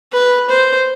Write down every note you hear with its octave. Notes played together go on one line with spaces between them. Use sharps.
B4
C5